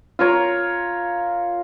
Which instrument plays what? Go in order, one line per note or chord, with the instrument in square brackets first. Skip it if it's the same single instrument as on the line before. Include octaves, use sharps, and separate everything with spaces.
[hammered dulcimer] F4 A#4 C#5